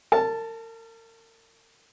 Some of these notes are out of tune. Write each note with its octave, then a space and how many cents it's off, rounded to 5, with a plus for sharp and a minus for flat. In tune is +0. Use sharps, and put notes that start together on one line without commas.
A#4 -40 A5 +0